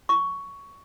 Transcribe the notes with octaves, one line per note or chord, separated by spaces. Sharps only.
C#6